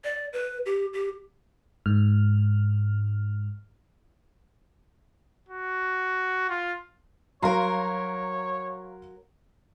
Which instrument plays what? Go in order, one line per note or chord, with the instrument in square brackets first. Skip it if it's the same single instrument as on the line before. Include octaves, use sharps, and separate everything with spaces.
[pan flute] D5
B4
G4
G4
[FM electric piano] G#2 F6
[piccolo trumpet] F#4
F4
[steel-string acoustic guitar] F#3 A#4 [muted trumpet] C#5 [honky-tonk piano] F5 A#5 C6